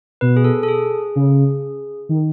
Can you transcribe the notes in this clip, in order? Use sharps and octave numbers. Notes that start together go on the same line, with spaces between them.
B2 B4
G#4
A4
A4
G#4
C#3
D#3